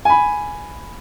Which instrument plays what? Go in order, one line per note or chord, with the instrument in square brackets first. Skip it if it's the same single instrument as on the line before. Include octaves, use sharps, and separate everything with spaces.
[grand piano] G#5 B5